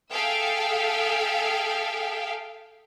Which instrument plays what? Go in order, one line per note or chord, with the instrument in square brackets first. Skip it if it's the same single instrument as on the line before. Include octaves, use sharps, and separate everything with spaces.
[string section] G#4 A4 E5 F5 G5